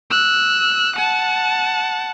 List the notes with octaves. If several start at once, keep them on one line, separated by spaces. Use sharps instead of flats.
E6 F#6
F#5 A5